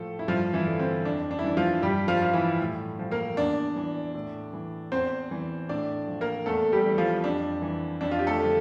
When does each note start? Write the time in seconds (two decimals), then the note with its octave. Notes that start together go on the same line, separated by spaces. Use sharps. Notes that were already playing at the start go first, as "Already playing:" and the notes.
Already playing: A2 F3 A3 A4
0.19 E4
0.28 G2 F3 F4
0.53 E3 E4
0.67 D3 F3
0.79 C4
1.04 F2 D4
1.31 D4
1.39 E4
1.44 E3 D4
1.57 F3 F4
1.82 G2 G3 G4
2.08 F3 F4
2.22 F3 F4
2.33 E3 E4
2.60 A2
2.99 F3
3.11 A#3 A#4
3.37 E2 D4 D5
3.76 E3
4.15 A2
4.53 E3
4.92 E2 C4 C5
5.31 E3
5.69 A2 D4 D5
6.07 F3
6.21 A#3 A#4
6.46 E2 A3 A4
6.72 G3 G4
6.85 E3
6.98 F3 F4
7.24 F2 D4
7.62 E3
8.01 F2 D4
8.11 F4
8.19 G4
8.27 A3 A4
8.40 D3 F3